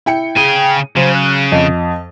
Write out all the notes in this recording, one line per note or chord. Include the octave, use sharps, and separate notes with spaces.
E4 G5 C#7
C#3 G#4 G5 G#5
C#3 F#3 C5
F#6
F2 D#5